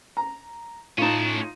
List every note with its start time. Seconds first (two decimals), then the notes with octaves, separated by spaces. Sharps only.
0.17 A#5
0.98 A2 C#4 D#4 F4 A5